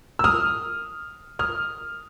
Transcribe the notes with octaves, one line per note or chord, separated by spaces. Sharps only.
E6
D#6 F6
D#6 F6